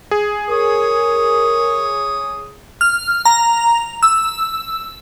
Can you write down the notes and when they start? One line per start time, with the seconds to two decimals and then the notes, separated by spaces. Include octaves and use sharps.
0.11 G#4
0.49 A#4 C#5 D#6
2.81 F6
3.25 A#5
4.03 E6